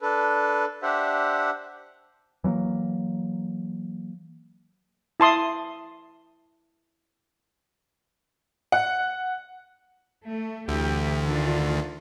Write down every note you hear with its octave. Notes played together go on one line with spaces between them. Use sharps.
D4 A4 B4
D4 G4 C5 E5 F#5
E3 F#3 A3 A#3
E4 A5 C6 D#6
F#5
A3
D2 E3 G4
D#3 D4 F4